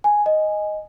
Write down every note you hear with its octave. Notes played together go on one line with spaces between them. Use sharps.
G#5
D#5